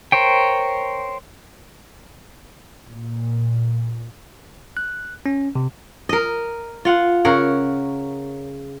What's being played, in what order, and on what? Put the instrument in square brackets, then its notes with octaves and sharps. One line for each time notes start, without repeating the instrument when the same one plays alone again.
[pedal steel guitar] A#4 C5 C#5 G5
[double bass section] A#2
[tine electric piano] F#6
C#4
C3
[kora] A#4 D#5
F4 F#5
C#3 A#4 C#5 F#5